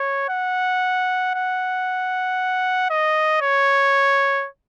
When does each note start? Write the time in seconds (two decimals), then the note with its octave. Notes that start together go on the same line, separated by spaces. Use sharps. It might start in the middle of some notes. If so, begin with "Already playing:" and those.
Already playing: C#5
0.29 F#5
1.34 F#5
2.90 D#5
3.41 C#5